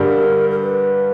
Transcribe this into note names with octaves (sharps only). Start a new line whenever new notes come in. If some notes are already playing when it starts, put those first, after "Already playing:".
Already playing: G2 D3 G3 A#4
A#4
B4